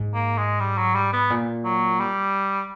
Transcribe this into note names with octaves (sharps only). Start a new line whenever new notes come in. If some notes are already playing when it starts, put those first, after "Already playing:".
Already playing: G#2
A#3
G#3
G3
F#3
G3
B3
A#2
F#3
G3